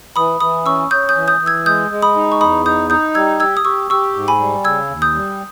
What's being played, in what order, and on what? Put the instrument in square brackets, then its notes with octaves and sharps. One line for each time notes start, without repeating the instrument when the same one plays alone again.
[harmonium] E3 [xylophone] B5 D#6
[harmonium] E3 [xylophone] B5 D#6
[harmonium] C#4 [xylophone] C#6 E6
[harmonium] C#4 [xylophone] D#6 G6
[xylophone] D#6 G6
[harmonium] E3
[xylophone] D#6 G6
[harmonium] E3
[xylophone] E6 G#6
[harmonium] G#3 [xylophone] D#6 G6
[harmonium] G#3
[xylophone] B5 D#6
[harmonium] D#4
[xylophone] C#6
[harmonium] E2 [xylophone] B5 D#6
[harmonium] D#4 [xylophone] D#6 G6
[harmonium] D#4 [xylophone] D#6 G6
[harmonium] G3 [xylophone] E6 G#6
[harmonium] G4 [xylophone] E6 G#6
[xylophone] D#6
[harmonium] G4 [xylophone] C#6 E6
[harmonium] G4 [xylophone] C#6 E6
[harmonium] G#2
[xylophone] G#5 B5
[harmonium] G3
[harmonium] C#3 [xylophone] E6 G#6
[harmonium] D#2
[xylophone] D#6 G6
[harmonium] G3